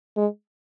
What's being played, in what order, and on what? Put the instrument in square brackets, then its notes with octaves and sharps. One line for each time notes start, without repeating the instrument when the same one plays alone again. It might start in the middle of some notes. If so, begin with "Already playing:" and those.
[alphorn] G#3